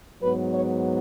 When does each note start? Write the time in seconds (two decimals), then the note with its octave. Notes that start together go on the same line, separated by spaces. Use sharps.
0.22 G#2 F#3 B3 B4
0.53 C#5